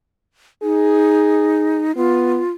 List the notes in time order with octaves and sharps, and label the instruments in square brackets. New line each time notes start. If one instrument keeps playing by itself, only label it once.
[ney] D#4 [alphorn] G#4
[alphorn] B3 [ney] F4